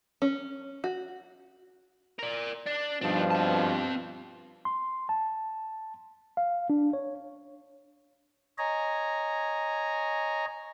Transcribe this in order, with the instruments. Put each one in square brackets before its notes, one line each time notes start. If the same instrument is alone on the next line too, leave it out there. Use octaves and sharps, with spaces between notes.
[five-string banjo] C#4
F#4
[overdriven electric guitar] A#4 D5
D4
[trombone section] G2 B2 F3 [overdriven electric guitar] D4 D#4
[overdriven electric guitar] C4 A5
[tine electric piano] C6
A5
F5
D4
C#5
[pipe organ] C#5 D#5 G#5 A#5